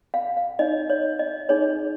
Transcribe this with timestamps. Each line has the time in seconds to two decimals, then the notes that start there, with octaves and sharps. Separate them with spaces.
0.14 F5
0.37 F5
0.59 D#4 C#5 D#5
0.90 C#5
1.19 D#5
1.49 D#4 G#4 C#5